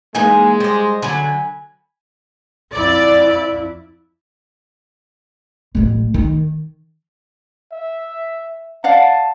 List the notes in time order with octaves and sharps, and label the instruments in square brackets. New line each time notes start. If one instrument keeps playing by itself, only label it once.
[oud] E3 A#3 D#4 [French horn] G#3 [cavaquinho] G#5
[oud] G3 [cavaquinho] C5 D#5
[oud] D3 F#3 [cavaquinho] G#5 B5
[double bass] F2 E4 [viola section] D5
[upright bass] A1 F#3
D#3
[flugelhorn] E5
[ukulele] D5 F5 F#5 [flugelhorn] A5